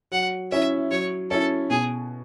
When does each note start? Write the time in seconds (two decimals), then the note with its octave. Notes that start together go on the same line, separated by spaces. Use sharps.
0.12 F#3 F#5
0.52 C#4 E4 E5
0.91 F#3 C#5
1.31 C#4 E4 A4
1.70 B2 G#4